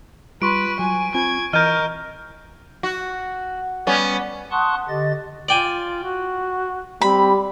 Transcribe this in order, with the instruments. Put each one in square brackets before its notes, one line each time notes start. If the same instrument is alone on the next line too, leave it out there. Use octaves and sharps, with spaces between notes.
[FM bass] G3 [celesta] F4 C6 [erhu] B4 [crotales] C#6 D7
[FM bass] F#3 [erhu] G#5
[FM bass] C4 [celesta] F4 G#5 [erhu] G#6
[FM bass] E3 [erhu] A#4 [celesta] D#5 D#7 [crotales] F6 G6
[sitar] F#4
G3 B3 C#4
[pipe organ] F#5 A5 C6 C#6 D#6 F#6
D3 G4 D#5 A6
[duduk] F4 [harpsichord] D5 G5 G#5
[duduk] F#4
[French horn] G3 [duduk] C4 [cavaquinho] B5